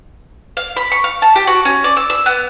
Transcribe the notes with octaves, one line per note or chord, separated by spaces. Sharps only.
F5
B5
C#6
F5
A5
G4
F#4
C#4
D5
E6
E6
B3